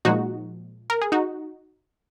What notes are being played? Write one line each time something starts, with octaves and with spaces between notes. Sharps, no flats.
A#2 F3 G#3 D#4 F#4
A#4
G#4
D#4 F#4